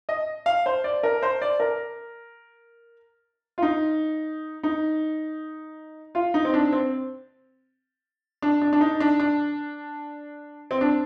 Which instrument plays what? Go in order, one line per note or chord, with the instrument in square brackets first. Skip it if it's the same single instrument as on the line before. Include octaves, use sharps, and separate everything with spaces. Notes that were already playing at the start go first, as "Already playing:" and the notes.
[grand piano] D#5
F5
C5
D5
A#4
C5
D5
A#4
F4
D#4
D#4
F4
D#4
C4
D4
C4
D4
D4
D4
D#4
D4
D4
C4
D4